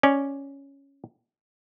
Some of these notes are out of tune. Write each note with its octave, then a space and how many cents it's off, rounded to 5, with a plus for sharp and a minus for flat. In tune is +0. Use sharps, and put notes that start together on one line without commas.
C#4 +0 D5 +0